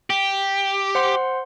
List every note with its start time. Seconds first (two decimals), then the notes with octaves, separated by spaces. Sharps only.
0.10 G4
0.95 C5 F#5 C6